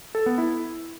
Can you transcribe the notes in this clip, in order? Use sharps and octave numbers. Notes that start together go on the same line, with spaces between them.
A4
B3
E4